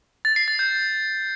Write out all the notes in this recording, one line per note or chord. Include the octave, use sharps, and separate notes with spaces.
A6
C7
A6
G6